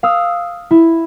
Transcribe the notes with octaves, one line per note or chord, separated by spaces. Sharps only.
F5 D#6 E6
E4